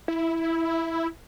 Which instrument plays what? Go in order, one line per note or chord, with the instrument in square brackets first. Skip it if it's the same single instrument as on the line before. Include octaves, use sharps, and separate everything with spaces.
[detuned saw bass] E4